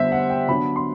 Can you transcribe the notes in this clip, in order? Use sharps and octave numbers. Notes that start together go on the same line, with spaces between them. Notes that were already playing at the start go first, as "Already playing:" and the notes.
Already playing: D3 G3 B3 C5 E5
F#5
G5
D3 F#3 B3 D4 B5
C6